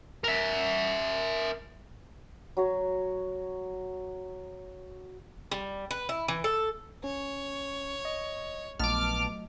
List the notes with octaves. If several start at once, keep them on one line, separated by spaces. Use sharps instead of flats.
A#4 E5
F#3 F#4 C#5
G3
B4
E4
E3
A4
C#4 C#5
D#5
A#1 F#3 A3 B3 D#5 A5 D6 F6